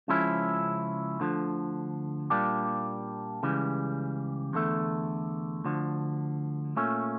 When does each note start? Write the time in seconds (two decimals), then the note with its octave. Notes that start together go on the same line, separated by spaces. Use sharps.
0.08 C#2 C#3 F3 C#4 E4
1.20 D2 D3 F3
2.30 A#2 G3 A#3 D4 G4
3.43 C#2 C#3 E3 G3
4.53 E2 D3 A3
5.64 D2 D3 F3
6.76 A#2 A3 C#4